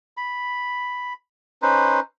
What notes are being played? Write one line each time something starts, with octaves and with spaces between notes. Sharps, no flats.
B5
C#4 D#4 B4 C5